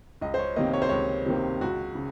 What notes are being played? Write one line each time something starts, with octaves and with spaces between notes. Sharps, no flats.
C#2 D#5
C5
C#5
C3 D#3 A#3 D#5
C#5
C5
C#2 C#5
C3 D#3 A#3
C#2 F#4
C#3